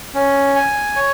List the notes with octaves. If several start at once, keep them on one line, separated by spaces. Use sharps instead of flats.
C#4
G#5
C#5